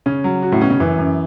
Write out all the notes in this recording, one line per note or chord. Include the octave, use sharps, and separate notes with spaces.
C#3 C#4
F#3
F#4
A2
B2 C#4
C#3
F#2 E3
F#2